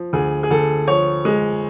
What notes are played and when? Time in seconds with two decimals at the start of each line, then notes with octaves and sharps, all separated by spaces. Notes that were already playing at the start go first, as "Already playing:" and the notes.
Already playing: F3
0.13 D2 G#4
0.43 G#4
0.51 D2 A4
0.88 F3 C#5
1.25 G#3